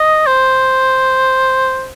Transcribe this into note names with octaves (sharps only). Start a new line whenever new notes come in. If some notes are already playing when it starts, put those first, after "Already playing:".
Already playing: D#5
C5